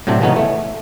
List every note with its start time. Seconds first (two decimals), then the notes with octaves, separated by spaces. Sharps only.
0.07 A2 C3 F#3 C4 D4
0.21 C#3 E3 A3 B3 C#4 D#4
0.36 A3